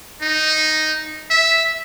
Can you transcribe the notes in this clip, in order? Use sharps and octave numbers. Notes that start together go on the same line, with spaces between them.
D#4
E5